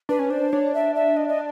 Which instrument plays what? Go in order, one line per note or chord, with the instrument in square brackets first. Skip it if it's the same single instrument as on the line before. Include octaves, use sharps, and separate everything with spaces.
[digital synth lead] D4 [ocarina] B4
[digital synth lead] C#4
[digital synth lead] D4 [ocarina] C5
[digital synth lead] D4 [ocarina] C#5
[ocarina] E5
E5
D#5
D#5